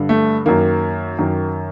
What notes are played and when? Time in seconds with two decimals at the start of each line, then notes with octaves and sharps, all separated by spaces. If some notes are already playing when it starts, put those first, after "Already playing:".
Already playing: G2 D3
0.09 A3
0.46 F#2 D#3 A#3
1.19 F#2 D#3